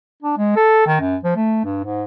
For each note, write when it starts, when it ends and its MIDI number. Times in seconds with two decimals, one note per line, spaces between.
0.23 0.37 62
0.38 0.56 56
0.56 0.85 69
0.87 0.97 51
1.00 1.16 42
1.24 1.33 53
1.36 1.63 57
1.65 1.81 43
1.84 2.04 44